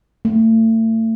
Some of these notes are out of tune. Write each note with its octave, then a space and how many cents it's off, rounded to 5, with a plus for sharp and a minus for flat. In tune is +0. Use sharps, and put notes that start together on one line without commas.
A3 +35